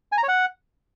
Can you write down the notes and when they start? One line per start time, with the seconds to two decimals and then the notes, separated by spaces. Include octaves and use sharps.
0.12 G#5
0.18 A#5
0.23 C#5
0.29 F#5